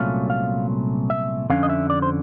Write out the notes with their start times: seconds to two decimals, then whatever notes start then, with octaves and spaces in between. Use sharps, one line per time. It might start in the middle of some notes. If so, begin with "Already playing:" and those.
Already playing: C2 A#2 F#3 A3 C#4 F5
0.30 F5
1.10 E5
1.50 F2 D3 F3 C#4 F5
1.63 D#5
1.70 E5
1.90 D5
2.02 C5